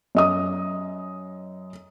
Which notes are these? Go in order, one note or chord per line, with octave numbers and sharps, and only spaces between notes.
F#2 D#5 D#6